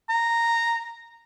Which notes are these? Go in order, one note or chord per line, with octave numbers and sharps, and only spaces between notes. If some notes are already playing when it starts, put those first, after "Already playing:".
A#5